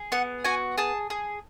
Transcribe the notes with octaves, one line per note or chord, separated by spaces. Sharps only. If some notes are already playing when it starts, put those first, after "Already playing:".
Already playing: G#4
B3 F#5
F#4 G#5
G#4 A5
G#4